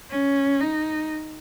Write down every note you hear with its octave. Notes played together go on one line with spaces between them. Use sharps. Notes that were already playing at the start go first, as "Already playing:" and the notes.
C#4
D#4